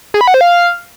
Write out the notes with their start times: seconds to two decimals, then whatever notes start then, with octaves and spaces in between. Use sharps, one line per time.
0.14 G#4
0.21 B5
0.28 F#5
0.34 C5
0.41 F5